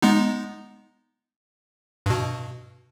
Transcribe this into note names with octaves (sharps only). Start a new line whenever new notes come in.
G#3 B3 D#4
G2 B2